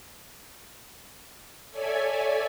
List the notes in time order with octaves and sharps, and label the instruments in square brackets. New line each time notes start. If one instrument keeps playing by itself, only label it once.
[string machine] A4 C#5 D5 E5 G#5